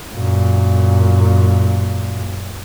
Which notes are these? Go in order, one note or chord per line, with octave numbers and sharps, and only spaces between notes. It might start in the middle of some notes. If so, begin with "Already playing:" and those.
F#2 A#2